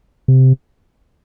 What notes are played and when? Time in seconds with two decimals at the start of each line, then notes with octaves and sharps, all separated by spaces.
0.28 C3